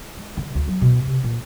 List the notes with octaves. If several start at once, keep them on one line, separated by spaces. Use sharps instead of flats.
G#3
D3
D2
F#3
B2
C3
A#2